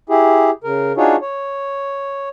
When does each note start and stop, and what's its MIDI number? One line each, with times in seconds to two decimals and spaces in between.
0.09 0.50 64
0.09 0.50 67
0.09 0.50 68
0.64 0.93 49
0.64 0.93 70
0.97 1.16 62
0.97 1.16 63
0.97 1.16 65
0.97 1.16 66
0.97 1.16 68
0.97 1.16 73
1.22 2.29 73